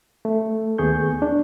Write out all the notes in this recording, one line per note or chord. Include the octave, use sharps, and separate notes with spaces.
A3
D#2 B3 G#4 C#6 G6
D4